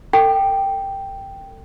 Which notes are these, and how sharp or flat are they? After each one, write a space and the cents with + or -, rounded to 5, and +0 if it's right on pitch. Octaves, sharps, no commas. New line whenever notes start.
A4 +35 G5 +0